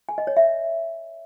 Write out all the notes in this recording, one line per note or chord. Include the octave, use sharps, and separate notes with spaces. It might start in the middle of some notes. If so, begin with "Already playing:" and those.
G#5
D#5
C#5
E5